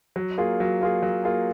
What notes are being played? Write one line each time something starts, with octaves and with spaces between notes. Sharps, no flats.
F#3
A#3 F4 G#4
F#3
A#3 F4 G#4
F#3
A#3 F4 G#4